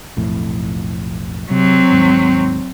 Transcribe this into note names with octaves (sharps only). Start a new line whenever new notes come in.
B1 F2 A2
C3 F#3 C4
D#2 G#2